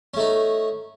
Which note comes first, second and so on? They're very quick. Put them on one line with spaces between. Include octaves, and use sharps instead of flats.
C#4 A3 D#4